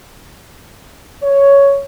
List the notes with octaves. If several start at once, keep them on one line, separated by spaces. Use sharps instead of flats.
C#5